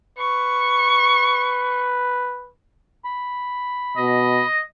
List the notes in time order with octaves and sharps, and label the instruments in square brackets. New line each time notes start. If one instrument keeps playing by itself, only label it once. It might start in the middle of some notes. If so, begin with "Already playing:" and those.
[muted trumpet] B4 [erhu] C#6
[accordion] B5
[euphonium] B2 [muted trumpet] D#5